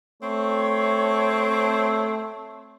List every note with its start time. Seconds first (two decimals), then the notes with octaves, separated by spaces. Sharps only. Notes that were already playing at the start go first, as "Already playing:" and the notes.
0.23 A3 C4 C#5